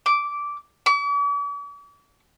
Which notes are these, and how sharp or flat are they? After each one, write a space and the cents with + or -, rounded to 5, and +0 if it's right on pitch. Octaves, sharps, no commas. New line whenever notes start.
D6 -10
D6 -45